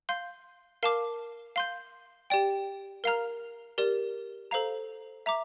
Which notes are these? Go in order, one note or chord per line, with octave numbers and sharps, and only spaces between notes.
F5 C6 G6
A#4 F5 A5 D6
F5 C6 G6
G4 D5 G5
A#4 F5 A#5 F6
G4 A#4 D5
A4 C5 F5 A#5
E5 A#5 D6